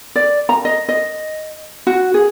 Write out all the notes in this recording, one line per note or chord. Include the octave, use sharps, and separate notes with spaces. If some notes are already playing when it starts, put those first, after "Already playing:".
D5
A#5
D#5
D#5
F#4
G#4